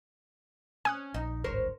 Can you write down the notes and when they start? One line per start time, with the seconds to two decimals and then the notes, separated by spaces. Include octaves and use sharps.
0.85 C#4 G#5 D#6 F#6
1.14 A#1 D#4
1.44 D1 G#1 G2 A#4 C5 C#5